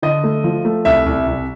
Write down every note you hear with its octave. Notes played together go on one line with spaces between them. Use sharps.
D3 D#5
A3
F3
A3
C2 E5
C2
C2